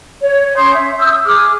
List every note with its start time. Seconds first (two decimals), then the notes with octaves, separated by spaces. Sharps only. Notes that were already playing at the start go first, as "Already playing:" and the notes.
0.21 C#5
0.56 C#4 C6 D#6 G6
0.73 E5
0.99 D#6 E6 G6
1.25 G#4 D6 F6